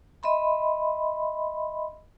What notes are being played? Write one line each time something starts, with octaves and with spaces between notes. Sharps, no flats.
D#5 E5 B5 C6